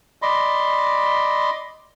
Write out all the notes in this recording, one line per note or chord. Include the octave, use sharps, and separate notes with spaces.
D5 D#5 B5 C6